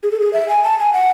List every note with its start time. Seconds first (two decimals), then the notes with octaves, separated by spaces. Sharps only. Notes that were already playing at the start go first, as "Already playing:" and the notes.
0.03 G#4
0.12 A4
0.20 G#4
0.33 E5
0.49 G#5
0.64 A5
0.79 G#5
0.93 F#5